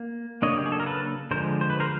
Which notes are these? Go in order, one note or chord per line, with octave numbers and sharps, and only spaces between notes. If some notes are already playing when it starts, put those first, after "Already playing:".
Already playing: A#3
C#3 F#3 A#3 D4 C#5 D#5
G4
G#4
A4
A#4
A4 B4
D3 F3 G#3 A#4 C5
C5
B4
A#4 C5